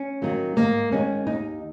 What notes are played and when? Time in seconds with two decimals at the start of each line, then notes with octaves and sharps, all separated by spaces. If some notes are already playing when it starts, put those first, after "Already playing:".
Already playing: C#4
0.22 D#3 F#3 A#3
0.56 G#2 A#3
0.91 D#3 G#3 C#4
1.27 D#2 D#4